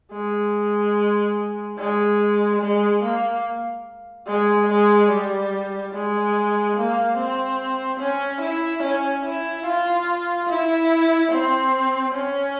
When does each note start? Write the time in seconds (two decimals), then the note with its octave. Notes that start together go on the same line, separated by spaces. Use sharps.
0.12 G#3
1.78 G#3
2.61 G#3
3.03 A#3
4.27 G#3
4.69 G#3
5.10 G3
5.93 G#3
6.76 A#3
7.17 C4
8.00 C#4
8.41 E4
8.83 C#4
9.25 E4
9.66 F4
10.49 E4
11.32 C4
12.15 C#4